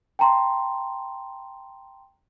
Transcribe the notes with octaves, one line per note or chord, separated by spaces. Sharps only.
G5 A5 A#5 C6